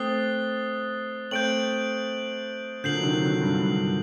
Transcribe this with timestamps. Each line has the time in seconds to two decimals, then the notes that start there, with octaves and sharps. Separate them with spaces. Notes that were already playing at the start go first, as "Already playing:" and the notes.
Already playing: A3 C4 D#6 F#6 A6 C7 G7
1.31 A3 C4 G6 D7 F#7
2.84 A#2 D3 G6 C7 F#7
2.95 F#3
3.03 C3 D#3
3.23 D3 F#3
3.41 G2
3.59 G2